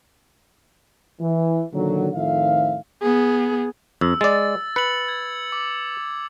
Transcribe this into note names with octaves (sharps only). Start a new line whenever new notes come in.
E3
A#2 D3 D#3 F3 F#3
F2 A2 D#3 F3 E5 F5
B3 G#4
F2 E6
G#3 D5 A6
B4 C#7 F#7
G#6
D6